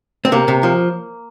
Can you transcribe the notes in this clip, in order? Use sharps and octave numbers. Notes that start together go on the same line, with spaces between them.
C4
C3 A#3
C3
F3